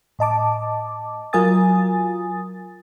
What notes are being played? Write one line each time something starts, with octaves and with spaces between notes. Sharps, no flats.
A2 D#5 A5 D6
F#3 F4 A#4 G#5 D#6 A6